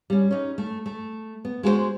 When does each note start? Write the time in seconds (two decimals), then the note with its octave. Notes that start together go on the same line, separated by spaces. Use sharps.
0.10 G3 C#4
0.31 C#4 D#4
0.58 A3
0.86 A3
1.45 B3
1.63 G#3 F#4 G#4 C5